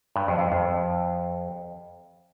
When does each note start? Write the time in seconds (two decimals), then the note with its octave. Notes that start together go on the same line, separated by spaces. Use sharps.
0.16 G2
0.28 F2
0.39 F2
0.52 F2